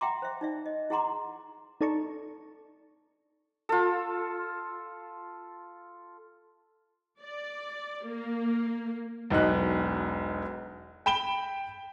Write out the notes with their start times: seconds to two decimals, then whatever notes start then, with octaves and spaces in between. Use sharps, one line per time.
0.01 E5 F#5 G5 A#5 C6 D6
0.22 C5 E5
0.41 D#4 D5 E5
0.66 D#5
0.90 E4 G#4 F#5 A#5 C6 D6
1.81 D#4 A4 D5 A5 A#5 C#6
3.69 F4 A4
7.22 D5
8.04 A#3
9.30 E1 B1 D#4 F#6
11.06 G5 B5 E7 G7